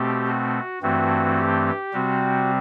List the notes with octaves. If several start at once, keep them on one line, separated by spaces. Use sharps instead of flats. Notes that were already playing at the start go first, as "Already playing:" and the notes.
Already playing: B2 A3 C4 G4
F#4
G2 E3 A3 C4 F#4
G4
C3 G3 C4 F#4